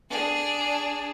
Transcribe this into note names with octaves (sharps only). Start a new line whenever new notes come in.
D4 G#4